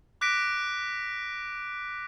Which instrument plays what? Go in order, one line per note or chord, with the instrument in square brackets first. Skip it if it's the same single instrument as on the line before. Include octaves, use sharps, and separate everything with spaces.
[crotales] D6 F#6 A#6 B6 D7